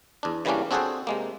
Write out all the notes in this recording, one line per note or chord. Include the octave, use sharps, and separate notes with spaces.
E2 D4
C#3 E3 G3 A#3 C#4 D4
C4 D4 F#4 G#4 A4 C5
C3 G#3 A#3